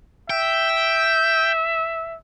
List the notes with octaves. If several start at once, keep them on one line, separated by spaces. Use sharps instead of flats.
E5 G5